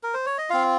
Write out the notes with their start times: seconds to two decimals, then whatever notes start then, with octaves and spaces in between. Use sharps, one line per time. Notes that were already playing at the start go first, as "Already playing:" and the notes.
0.03 A#4
0.14 C5
0.26 C#5
0.38 D#5
0.50 C4 F4 F5